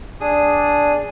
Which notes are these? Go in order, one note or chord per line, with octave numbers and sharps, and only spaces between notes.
D4 G#4 D#6